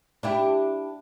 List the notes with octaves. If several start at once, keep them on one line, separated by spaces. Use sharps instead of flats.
D4 E4 G4